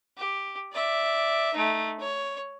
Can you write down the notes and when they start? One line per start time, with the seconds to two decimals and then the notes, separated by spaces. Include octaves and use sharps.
0.17 G4
0.73 D5 E5
1.54 A3 D#4
2.00 C#5